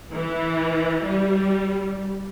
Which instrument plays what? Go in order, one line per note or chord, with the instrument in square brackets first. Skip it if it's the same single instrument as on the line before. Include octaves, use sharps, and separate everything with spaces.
[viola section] E3
G3